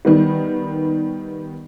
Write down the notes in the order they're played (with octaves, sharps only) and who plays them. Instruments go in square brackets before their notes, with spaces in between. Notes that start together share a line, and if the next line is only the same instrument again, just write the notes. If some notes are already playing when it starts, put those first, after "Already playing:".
[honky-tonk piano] D#3 G3 B3